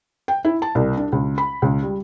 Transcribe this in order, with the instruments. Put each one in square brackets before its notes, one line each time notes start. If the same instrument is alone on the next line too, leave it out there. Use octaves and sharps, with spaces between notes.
[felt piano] G5
E4
A5
C2
D4
C#2
B5
C#2
G3